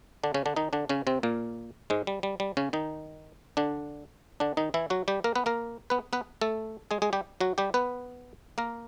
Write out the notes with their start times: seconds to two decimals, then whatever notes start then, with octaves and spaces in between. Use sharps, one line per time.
0.24 D3 D4
0.34 C#3 C#4
0.46 D3 D4
0.56 D#3 D#4
0.73 D3 D4
0.89 C#3 C#4
1.07 C3 C4
1.23 A#2 A#3
1.90 G#2 G#3
2.07 G3
2.23 G3
2.40 G3
2.57 C#3 C#4
2.73 D#3 D#4
3.57 D3 D4
4.40 D3 D4
4.57 D#3 D#4
4.74 E3 E4
4.90 F#3 F#4
5.08 G3 G4
5.24 A#3 A#4
5.35 B3 B4
5.46 A#3 A#4
5.90 B3 B4
6.13 B3 B4
6.41 A3 A4
6.91 G#3 G#4
7.02 G#3 G#4
7.13 G3 G4
7.41 F#3 F#4
7.58 G3 G4
7.74 B3 B4
8.58 A#3 A#4